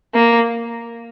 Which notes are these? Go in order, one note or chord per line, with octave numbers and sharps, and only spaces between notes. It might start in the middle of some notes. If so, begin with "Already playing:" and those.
A#3